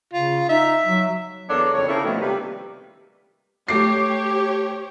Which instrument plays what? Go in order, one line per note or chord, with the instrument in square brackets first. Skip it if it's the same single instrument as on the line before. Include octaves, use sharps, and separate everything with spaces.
[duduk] C#3 [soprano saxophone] F4
[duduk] D#4 [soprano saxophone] E5
[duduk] F#3
[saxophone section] E2 A#3 D4 A4 C#5
F2 C#3 C#5
C#3 A#3 C4 E4 A4
B2 D#3 F3 A3
C3 G3 A#3 B4
[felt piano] A3 D6 C7 [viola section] G4 C#5